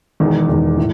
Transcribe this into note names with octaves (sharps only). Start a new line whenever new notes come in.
E1 E2 D#3
E1 E2 D#3
A2